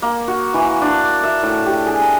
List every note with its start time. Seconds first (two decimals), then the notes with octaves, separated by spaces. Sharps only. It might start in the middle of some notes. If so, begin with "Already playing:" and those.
0.02 A#3
0.28 F#4
0.54 E3
0.82 D4
1.23 E5
1.43 A2
1.66 G4
1.86 G#4
2.01 A#5